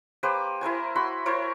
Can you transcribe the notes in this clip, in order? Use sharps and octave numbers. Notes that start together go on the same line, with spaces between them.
A#3 G4 B4 C5
E4 A#4 C5 G#5
F#4 B5 C6
E4 A#4 C5 C#5